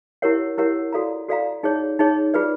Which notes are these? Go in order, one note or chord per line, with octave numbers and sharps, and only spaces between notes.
E4 G4 A#4 C#5 F#5
E4 G4 A#4 C#5 F#5
F#4 A4 D5 F5 A#5
F#4 A4 D5 F5 A#5
D#4 G#4 C#5
D#4 G#4 C#5
F4 G#4 B4 D5